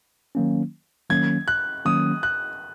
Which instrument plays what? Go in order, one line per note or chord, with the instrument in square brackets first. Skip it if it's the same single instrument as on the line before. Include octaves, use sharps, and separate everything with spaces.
[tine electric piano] D#3 F#3 A#3 C#4
[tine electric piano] D#3 F#3 A#3 C#4 [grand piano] G#6
[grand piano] F#6
[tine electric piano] D#3 F#3 A#3 C#4 [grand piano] D#6
[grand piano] F#6